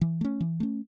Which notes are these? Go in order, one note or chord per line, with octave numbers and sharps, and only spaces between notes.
E3
A3 C#4
E3
A3 C#4